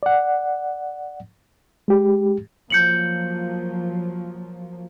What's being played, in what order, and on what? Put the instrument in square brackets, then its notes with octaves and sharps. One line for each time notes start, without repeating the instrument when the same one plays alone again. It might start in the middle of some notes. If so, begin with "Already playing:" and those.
[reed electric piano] D5 F#5
G#3 G4
[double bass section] F3 F#3 A#3 [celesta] G6 C#7 F#7